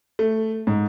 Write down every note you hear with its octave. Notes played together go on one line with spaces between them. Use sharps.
A3
G#2